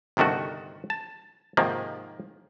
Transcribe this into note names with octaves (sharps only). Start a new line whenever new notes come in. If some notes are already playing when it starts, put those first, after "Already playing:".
G1 C3 D#3 A3 F#4
A5
G#2 C3 D#3 F3 A#3